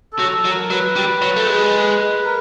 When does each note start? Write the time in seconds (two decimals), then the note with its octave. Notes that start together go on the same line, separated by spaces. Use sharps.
0.13 A4
0.19 F#3
0.32 A4
0.45 F#3
0.51 A#4
0.70 F#3 B4
0.96 G3
1.22 F#3
1.37 A3
1.47 G#3
2.24 A#4